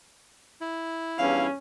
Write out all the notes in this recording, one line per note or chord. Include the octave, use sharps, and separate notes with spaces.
E4
A#1 E2 G2 C#4 F5